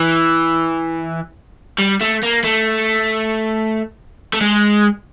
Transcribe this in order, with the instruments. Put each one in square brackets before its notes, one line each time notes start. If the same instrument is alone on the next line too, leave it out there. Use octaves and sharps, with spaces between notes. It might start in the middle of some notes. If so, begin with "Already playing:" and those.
Already playing: [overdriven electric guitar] E3
G3
A3
A#3
A3
A3
G#3